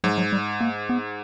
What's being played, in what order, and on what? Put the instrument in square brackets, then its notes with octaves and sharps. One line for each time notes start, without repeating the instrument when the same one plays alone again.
[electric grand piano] G#2 [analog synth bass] F#3
[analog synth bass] F#3
G3
A#3
B3